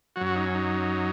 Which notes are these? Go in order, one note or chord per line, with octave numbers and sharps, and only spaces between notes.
F#2 F#3 F#4
F#4
D#4
C#4
D#4